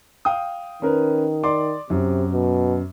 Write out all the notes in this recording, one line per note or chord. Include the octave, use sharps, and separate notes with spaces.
F5 G5 D#6
D#3 C#4 A#4 B4
D5 C6 D6
F#2 C3
B2